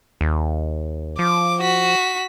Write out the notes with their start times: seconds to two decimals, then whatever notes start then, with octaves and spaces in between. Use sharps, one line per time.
0.21 D#2
1.19 F3 D6
1.61 F#4 B6